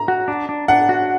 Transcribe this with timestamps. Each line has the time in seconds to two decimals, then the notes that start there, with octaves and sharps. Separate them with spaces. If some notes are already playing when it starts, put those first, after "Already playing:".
Already playing: A#5
0.08 F#4
0.28 D4
0.49 D4
0.68 D4 F#5
0.89 F#4